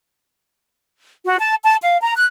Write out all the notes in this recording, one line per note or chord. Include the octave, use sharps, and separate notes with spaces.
F#4
A5
A5
F5
A#5
F#6